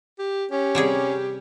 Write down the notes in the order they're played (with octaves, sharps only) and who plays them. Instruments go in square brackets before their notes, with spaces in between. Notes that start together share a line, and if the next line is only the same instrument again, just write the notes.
[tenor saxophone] G4
[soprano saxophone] C#4 [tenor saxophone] G4
[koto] C3 G3 G#4